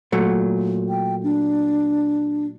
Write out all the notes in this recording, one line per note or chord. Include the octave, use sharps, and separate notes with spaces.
A#2 F#3 A3
G5
D4